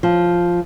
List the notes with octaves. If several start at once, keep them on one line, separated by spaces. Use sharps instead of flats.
F3